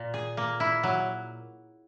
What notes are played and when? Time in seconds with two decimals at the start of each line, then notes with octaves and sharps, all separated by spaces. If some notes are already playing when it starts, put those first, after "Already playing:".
Already playing: A#2
0.14 G#4
0.37 A#3
0.60 E4
0.83 F#3